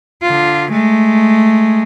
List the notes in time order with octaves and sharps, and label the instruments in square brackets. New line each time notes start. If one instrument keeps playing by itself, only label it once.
[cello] D3 F4
G#3 A3